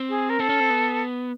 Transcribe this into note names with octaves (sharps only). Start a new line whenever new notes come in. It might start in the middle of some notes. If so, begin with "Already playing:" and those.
Already playing: C4
G#4
A#4
C4 A4
C#4
C4
B3